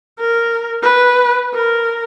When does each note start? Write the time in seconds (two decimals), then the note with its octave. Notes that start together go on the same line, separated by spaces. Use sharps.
0.20 A#4
0.82 B4
1.55 A#4